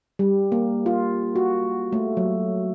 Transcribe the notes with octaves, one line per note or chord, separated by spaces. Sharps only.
G3
A#3
F4
F#4
A3
F#3